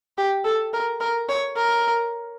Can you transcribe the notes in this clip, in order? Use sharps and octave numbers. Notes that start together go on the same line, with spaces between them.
G4
A4
A#4
A#4
C#5
A#4